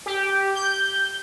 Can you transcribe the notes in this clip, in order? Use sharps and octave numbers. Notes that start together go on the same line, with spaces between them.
G4
G6